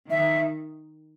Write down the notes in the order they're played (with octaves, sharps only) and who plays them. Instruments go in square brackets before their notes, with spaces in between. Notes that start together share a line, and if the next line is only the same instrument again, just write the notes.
[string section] D#3 [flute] E5